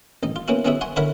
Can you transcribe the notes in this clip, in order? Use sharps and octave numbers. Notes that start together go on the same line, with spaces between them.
A1 D#4
F4
A#3 B3 C#4 E4 F#4
B3 C#4 E4 F#4 G#4 E5
F#5 G#5 C6 C#6
D3 E4 A#4 C#5 F#5 B5